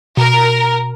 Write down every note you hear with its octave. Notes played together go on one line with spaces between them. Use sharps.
B2 A#4